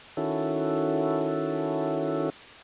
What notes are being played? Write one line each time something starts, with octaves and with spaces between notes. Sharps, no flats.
D#3 C#4 E4 F#4 A4